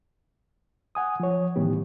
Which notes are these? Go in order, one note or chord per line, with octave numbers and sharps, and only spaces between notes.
F#5 G#5 D#6
F3 C#5
A2 D#3 E3 G3 B3 G4